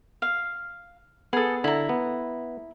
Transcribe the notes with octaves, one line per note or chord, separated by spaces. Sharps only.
F5
B3 G#4 A4
D3 E4 A#5
B3